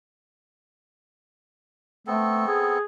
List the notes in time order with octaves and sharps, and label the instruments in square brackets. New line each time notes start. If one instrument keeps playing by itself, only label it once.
[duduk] A3 [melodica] B3 C4 A4
[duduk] G#4